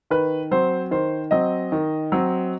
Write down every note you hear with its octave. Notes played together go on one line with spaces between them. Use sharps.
D#3 B4
F#3 C4 C5
D#3 C5
F#3 C4 D#5
D#3
F#3 C4